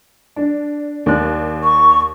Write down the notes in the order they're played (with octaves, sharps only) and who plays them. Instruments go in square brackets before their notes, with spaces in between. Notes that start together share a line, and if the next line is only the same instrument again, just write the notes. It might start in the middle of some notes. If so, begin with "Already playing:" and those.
[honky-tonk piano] D4
D#2 D5 F#6
[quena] C#6